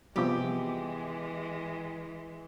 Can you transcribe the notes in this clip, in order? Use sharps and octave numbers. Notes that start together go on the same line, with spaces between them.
C3 E3 F3 G3 G#3 B3 G4 D6